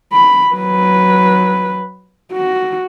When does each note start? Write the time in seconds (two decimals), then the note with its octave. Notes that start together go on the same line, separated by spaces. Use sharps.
0.12 B5
0.53 F#3 B4
2.32 F#4